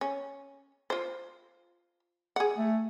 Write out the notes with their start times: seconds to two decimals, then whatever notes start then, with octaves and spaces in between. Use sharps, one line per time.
0.01 C#4
0.90 F4 C5
2.36 G#4 F#5
2.58 A3